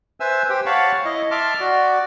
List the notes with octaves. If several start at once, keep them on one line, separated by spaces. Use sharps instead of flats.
B4 C5 E5 G#5 E6
G4 C5 G5
C#5 F5 F#5 A5 B5 C#6
E4 D#5
E5 A5 C6 D6 F6
F#4 D5